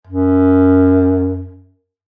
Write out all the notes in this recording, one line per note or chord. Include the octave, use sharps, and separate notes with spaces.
F#2